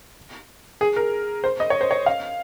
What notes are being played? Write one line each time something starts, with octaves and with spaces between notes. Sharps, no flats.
G#4
A#4
C5
D#5
C#5
C5
C#5
F5